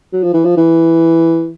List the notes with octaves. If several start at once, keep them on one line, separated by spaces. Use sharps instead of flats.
F#3
F3
E3
F3
E3